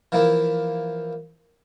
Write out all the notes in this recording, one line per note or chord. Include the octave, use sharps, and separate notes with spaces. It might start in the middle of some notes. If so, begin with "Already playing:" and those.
E3 F3 A#3 E4